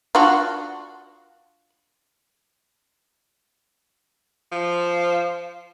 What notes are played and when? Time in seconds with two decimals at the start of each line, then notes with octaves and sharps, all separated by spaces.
0.15 D4 F4 F#4
4.52 F3